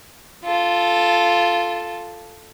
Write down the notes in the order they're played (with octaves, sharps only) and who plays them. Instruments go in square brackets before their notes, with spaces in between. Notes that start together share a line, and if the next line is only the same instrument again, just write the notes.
[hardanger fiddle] F4 A4